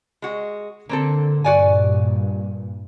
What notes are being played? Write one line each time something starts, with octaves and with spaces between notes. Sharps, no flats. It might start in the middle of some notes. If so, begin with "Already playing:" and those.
G#3 F#4
D3 A#3 C4 A4
G2 A#2 F#4 D5 G#5